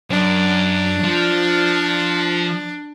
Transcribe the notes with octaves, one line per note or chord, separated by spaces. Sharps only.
F#2 D4
F3